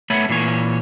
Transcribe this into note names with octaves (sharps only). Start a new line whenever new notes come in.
A3 B3 C#5 B5
A#2 E3 C#5